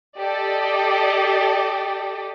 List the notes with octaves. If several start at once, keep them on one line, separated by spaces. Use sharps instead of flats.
G4 A4 D5 D#5